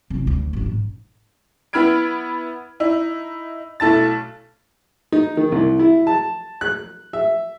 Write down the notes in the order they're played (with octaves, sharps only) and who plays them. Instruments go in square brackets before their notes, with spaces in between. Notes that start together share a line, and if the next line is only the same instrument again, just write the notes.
[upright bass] C2 C#3
D2 D#4
A1 D4
G#2
[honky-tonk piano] B3 E4 B5 F6 G#6 D7
D#4 E4
B1 A3 E4 A5 A6
[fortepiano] D#4
D#3
C2
E4
A5
F#6
E5